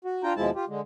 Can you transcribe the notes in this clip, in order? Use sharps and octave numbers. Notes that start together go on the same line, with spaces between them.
F#4
D4 F4 G5 A#5
D#2 B2 F3 G#3 E4 A5
F4 G4
D3 G#3